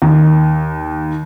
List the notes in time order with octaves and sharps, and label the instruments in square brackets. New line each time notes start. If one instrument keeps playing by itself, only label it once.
[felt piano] D#2